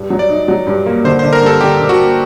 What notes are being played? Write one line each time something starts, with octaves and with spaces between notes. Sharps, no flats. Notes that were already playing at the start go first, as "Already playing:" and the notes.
Already playing: G2
F#3
D5
D#4
F#3
G2
A#3
D3 C5
C5
D3
A#4
G2 A4
D3 G4
D3
F#4
A#3